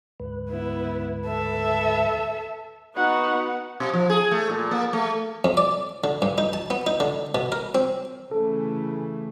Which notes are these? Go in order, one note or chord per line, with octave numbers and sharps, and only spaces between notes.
D2 G#2 B4
B3 E4
A4 E5
B3 D#4 F#4 B4 F#5
B2
F3
G#4
A3
A#2
A#3
A3
F2
D5
D3
G2
D#4
A5
B3
D#4
D3
B2
A#4
C4
C#3 E3 A3 A4